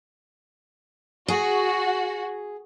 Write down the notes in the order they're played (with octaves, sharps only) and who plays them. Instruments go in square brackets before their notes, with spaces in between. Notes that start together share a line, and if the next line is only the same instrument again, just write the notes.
[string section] F#4 [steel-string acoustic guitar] G#4